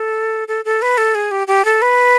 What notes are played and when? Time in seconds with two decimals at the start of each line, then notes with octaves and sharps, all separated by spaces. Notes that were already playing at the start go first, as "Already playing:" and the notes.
Already playing: A4
0.48 A4
0.65 A4
0.82 B4
0.98 A4
1.15 G#4
1.31 G4
1.47 G4
1.65 A4
1.82 B4